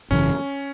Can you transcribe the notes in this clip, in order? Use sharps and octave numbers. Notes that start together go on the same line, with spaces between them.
G#1 F#2 C#3 E3 C#4